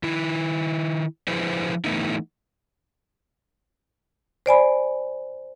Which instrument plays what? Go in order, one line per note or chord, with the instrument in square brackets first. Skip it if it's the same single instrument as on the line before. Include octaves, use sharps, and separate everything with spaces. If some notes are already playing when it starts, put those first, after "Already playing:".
[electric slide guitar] D#3 E4
F3 E4 G#4 B4 C5
E3 A3 B3 D#4 E4
[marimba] C5 D5 G#5 B5